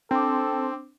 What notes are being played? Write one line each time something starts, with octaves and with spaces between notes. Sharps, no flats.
C4 D4 A4 D6